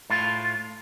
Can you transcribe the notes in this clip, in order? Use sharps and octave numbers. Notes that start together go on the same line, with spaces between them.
A2 F4